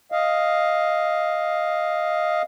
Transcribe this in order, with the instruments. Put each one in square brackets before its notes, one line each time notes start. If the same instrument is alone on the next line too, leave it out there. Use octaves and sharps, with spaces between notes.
[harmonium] D#5 F5